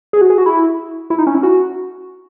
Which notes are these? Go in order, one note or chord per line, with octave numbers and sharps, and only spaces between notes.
G#4
F#4
G#4
F#4
E4
E4
D#4
C#4
E4
F#4